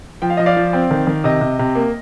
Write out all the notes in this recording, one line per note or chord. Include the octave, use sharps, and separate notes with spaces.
F3 G5
F5
F3 D#5
D5 F5
F3
C4
D#3
D#3
C3 D#5
C3
C3
A#3